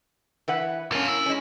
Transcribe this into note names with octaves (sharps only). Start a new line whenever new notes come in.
E3 B4 F#5
A#3 C#4 A4 F5
E4
G#3 C#4